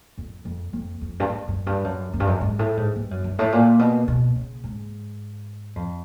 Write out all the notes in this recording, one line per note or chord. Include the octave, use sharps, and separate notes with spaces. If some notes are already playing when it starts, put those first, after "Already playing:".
F2
F2
F2
F2
G2
F#2
F#2
G2
F#2
F#2
G2
F#2
G#2
A2
G#2
G2
F#2
G2
A2
A#2
B2
B2
C#3
G#2
F2